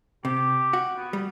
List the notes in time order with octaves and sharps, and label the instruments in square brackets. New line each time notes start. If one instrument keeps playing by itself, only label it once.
[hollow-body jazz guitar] C3 [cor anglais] G4
[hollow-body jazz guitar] F#4
[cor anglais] B3
[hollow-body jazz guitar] G3